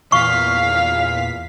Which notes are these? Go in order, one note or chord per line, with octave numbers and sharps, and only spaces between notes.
E2 A#2 F5 C#6 B6